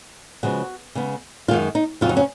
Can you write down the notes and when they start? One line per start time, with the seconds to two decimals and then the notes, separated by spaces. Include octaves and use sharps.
0.43 C#3 F3 G#3 B3 F#4
0.95 C#3 G#3 B3
1.48 F#2 D#3 G#3 F4
1.75 D#4
2.01 F2 C#3 F#3 F4
2.09 D#4
2.17 C#4